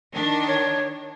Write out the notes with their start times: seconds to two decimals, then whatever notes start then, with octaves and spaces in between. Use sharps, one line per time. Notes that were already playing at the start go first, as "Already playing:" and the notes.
0.14 D#3 D4
0.48 C#5